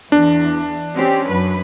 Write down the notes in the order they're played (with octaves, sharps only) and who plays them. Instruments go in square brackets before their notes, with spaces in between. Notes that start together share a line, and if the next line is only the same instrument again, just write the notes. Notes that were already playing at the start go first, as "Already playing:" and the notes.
[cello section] E2 [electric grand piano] D4
[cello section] C4 C#4 G4
F#2 B4